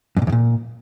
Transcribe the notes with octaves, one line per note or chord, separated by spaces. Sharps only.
F#2
A#2
E2
A#2